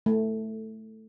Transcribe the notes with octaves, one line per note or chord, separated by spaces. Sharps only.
A3